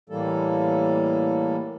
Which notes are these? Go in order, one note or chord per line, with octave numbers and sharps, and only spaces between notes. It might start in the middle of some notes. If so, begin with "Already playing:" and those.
A2 E3 G3 A#3 A4